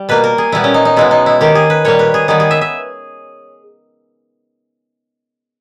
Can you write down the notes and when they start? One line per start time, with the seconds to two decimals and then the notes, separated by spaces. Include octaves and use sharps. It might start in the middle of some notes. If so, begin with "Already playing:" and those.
Already playing: G3
0.09 B2 A#3 B4
0.24 A#4
0.38 G#4
0.52 A#2 G3 B3 E4
0.64 C#4
0.74 D#4
0.85 D#4
0.96 B2 G#3 B3 E4
1.11 D#4
1.26 E4
1.41 D#3 A#3 G4
1.55 G#4
1.70 B4
1.85 A#2 G3 A#3 C#5
1.99 B4
2.14 G#4
2.28 D#3 G3 B3 G#4
2.40 G#4
2.51 E5
2.61 E5